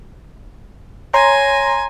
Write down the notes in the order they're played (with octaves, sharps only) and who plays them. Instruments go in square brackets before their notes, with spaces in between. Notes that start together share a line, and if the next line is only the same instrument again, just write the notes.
[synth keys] C#5 A#6 [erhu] G#5 [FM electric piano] A#5 C6